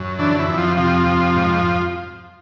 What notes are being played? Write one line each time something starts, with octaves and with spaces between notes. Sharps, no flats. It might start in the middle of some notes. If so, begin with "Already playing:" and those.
Already playing: F#2
D3 E3 D4
E3 E4
F2
F3 F4
C3 F3 F4
F2
G#2